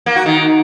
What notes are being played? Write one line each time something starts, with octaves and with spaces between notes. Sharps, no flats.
A#3
F#4
D#3